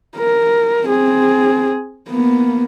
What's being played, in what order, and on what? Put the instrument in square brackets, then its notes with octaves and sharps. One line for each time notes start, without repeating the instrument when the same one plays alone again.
[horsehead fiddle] A#4
C4 G#4
A#3 B3